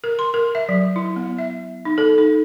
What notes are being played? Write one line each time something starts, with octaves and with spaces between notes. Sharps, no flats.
A#4
C6
A#4
E5
F#3
E4
B3
E5
D#4
A4
D#4